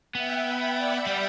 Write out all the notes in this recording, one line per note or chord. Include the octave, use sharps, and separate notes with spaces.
B3 E5 G5
G5 B5
D5 F#5
G3